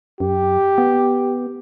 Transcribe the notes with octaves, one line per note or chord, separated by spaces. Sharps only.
F#2 G4
B3